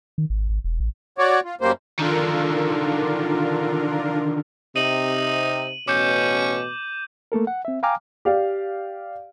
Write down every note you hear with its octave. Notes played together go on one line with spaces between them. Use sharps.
D#3
G#1
G#1
E1
A1
F#4 C#5 D5
F4
F#2 G3 A#3 C5
D3 D#3 D4 F4 A#4
C3 D#4 D#7 F#7
A1 B2 C#4 D6 G6
A3 A#3 A4 A#4
F#5
C4 E5
F5 G5 G#5 A#5 D6 F6
G4 D5 F5